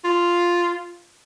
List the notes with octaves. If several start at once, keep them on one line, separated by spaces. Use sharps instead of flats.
F4